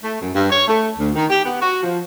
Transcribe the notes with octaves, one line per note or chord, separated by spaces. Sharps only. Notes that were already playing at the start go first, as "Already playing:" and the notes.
A3
F#2
G2
C#5
A3
D2
D#3
G4
B3
F#4
F3